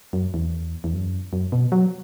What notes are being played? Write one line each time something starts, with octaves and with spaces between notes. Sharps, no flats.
F#2
E2
E2
F#2
F#2
B2
F#3